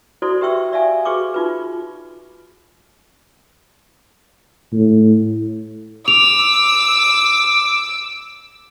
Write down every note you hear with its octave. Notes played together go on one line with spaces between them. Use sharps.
E4 F#4 A4 C5 D5
G4 B4 E5 G5 C#6 E6
D5 E5 F5 G#5
F#4 G#4 B4 C#6 D6
D#4 F4 B4
A2
D6 E6 F7